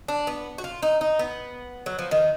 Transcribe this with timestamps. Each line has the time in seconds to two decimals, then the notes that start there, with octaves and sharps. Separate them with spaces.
0.08 D4
0.27 B3
0.58 F#4
0.64 F4
0.82 D#4
1.01 D#4
1.19 B3
1.86 F#3
1.99 F3
2.11 D#3